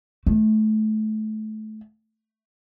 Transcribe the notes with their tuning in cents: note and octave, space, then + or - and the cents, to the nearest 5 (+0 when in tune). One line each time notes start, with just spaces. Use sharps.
A3 -25